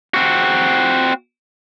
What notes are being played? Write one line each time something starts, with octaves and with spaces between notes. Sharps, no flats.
C4 F#4